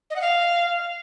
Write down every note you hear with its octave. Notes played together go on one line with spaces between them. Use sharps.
D#5
F#5
F5